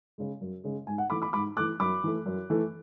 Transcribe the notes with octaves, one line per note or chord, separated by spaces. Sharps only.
C#3 G#3
F#2
C#3 G#3
G#2 G#5
F#5
E3 A3 B5 D6
B5 D6
G#2 B5 D6
E3 A3 D6 F#6
F#2 B5 D6
E3 A3
F#2
E3 A3